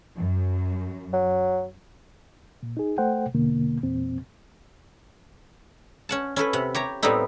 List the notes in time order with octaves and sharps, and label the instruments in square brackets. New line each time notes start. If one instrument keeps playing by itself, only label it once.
[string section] F#2
[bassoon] F#3
[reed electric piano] A#2
D#4 G#4
A3 A4 C5 F#5 G5
E2 B2 D3 A#3
E2 A#2 C4
[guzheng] C#4 F#5 A5
C#4 E4 A4 B4
C3 F#5
G4 C#5 A#5
A2 G3 B3 C4 D#4 E4